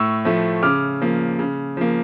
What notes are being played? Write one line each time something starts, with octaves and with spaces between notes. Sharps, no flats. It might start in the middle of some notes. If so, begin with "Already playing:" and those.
Already playing: A2 C#6 E6
F3 A3
C#3 D6 F6
F3 A#3
C#3
F3 A#3